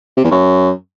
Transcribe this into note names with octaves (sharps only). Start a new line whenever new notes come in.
C3
E2
F#2